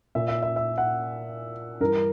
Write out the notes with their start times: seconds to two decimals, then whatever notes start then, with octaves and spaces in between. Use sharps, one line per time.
0.15 A#2 E5
0.28 E5
0.43 E5
0.56 E5
0.78 F#5
1.80 G2 E3 A#4